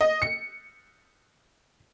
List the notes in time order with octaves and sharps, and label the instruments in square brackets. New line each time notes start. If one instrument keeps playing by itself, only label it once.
[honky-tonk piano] D#5
C#7